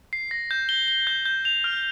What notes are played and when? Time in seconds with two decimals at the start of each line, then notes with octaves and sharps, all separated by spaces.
0.13 C7
0.31 A#6
0.51 G6
0.69 G7
0.88 G7
1.07 G6
1.25 G6
1.45 F7
1.64 F6